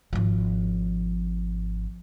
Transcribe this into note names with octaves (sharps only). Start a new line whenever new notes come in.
G#1 F3